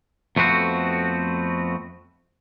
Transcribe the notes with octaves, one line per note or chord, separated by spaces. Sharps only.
F2 A3 B3 C4 F#4